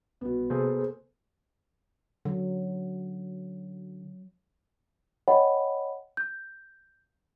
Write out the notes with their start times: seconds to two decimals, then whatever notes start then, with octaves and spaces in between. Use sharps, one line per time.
0.21 C2 B2 B3
0.50 C3 A#3 G#4 A4 C5
2.25 D3 F#3
5.28 C#5 D#5 F#5 G5 B5
6.17 G6